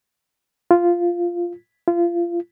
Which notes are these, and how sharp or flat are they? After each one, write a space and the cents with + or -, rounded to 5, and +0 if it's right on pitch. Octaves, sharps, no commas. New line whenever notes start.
F4 -5
F4 -25